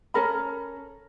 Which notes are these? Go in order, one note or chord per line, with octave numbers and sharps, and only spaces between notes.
C#4 A4 A#4 B5